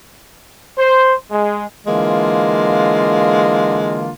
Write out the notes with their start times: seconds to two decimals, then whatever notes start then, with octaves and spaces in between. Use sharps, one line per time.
0.78 C5
1.31 G#3
1.87 D3 E3 G#3 A#3 F4